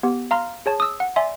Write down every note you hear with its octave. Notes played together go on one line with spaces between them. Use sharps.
B3 G4
F5 A#5 C6 F6
G#4 C#5 A5
D#6 E6
F#5
D5 E5 G#5 C6